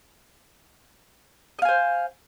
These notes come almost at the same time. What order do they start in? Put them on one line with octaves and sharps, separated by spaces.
D#5 F5 G#5 C5